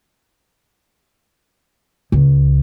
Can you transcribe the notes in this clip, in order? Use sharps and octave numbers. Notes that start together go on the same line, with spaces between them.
C#2